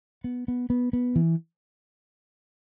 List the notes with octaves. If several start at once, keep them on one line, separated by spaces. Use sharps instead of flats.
B3
B3
B3
B3
E3